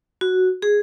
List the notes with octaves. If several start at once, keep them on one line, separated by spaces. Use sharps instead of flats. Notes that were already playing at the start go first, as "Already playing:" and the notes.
F#4
G#4